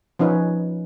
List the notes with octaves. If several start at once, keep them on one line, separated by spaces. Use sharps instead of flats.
F3 C#4 D#4 B4